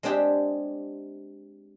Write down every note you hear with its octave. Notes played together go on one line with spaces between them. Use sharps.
G#3 C4 D4 G4 G#4 E5